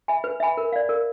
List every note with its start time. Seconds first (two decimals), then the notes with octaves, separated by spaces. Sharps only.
0.08 E5 G#5 B5
0.24 B4
0.40 E5 G#5 B5
0.57 A#4
0.72 D5 F5
0.89 A#4